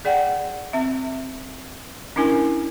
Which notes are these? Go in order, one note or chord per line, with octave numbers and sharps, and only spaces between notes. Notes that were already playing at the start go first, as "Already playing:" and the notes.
G#4 D5 F#5 G5
C4 E5
C#4 D4 E4 A#4 G#5